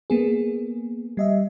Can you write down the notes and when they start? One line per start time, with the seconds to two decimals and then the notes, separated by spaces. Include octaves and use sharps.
0.10 A#3 B3 G#4
1.17 G3 D#5 E5